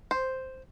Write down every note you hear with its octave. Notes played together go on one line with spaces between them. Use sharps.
C5